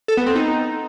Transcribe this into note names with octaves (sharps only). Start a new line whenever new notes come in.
A4
B3
C4
D#4